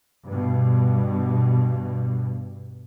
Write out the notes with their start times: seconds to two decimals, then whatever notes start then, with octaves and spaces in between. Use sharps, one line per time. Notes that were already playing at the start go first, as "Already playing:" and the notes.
0.27 G2 B2